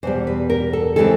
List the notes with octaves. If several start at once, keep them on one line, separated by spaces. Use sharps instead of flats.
E2 B2 G3 C5
B4
A#4
A4
C#3 E3 G#3 C4 A4